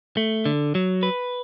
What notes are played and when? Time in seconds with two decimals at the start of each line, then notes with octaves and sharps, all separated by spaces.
0.17 A3
0.45 D3
0.75 F#3
1.03 B4